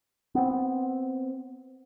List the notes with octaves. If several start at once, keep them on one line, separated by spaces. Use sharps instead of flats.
B3 C4